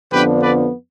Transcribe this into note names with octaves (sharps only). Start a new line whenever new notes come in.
F2 D3 F3 B3 D4 G4 B4
B4 D5